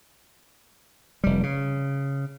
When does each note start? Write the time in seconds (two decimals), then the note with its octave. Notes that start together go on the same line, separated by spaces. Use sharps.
1.24 F1 G3
1.43 C#3